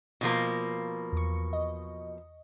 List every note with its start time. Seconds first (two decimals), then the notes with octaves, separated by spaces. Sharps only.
0.21 B2 F3 A#3
1.13 E2 C#6
1.53 D#5